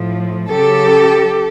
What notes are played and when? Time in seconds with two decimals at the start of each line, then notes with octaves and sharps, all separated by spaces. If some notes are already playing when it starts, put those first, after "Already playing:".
Already playing: A2 F3
0.50 C#3 F#3 G4 A4